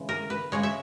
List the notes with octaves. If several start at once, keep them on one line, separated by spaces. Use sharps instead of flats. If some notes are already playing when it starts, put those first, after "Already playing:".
Already playing: C#3 E3 G#3
A#4
B4
C#3 G#3 C#5
E5